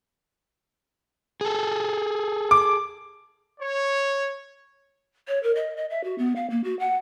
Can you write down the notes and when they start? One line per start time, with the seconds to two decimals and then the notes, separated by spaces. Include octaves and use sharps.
1.41 G#4 A4
2.51 D6
3.61 C#5
5.27 C#5
5.43 A#4
5.55 D#5
5.77 D#5
5.90 E5
6.04 F#4
6.18 B3
6.36 F5
6.50 A#3
6.64 F#4
6.79 F#5